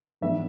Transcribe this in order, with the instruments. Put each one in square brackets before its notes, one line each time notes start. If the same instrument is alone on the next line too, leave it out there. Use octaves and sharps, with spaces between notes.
[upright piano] G#2 E3 B3 D4 E5